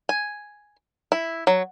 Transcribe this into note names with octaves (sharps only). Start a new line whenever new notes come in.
G#5
E4
F#3